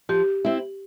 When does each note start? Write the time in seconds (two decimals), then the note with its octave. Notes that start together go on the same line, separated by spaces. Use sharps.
0.09 F3 G4
0.45 C4 E4